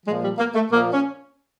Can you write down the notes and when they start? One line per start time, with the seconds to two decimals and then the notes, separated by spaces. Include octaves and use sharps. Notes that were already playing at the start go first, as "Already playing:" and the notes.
0.05 A#2 F3 G#3
0.22 G3
0.38 A#3
0.54 A3
0.70 A#2 F3 A#3
0.92 C#4